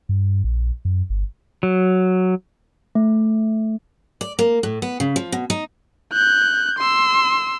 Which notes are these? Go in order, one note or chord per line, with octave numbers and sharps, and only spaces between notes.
G2
A#1
F#2
G1
F#3
A3
D5
A#3
A2
B3
C#3
F3
B2
D#4
F#6 G6
C6 E6